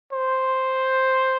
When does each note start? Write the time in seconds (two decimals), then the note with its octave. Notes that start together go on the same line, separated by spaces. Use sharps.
0.13 C5